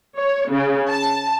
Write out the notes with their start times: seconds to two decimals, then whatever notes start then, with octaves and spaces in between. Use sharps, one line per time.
0.17 C#5
0.49 C#3
0.89 A5